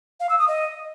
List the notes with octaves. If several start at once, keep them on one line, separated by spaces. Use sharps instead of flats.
F5
E6
D#6
D#5